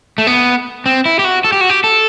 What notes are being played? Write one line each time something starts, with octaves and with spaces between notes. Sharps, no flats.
A3
B3
C4
E4
G4
F#4
A4
G4
F#4
G4
A4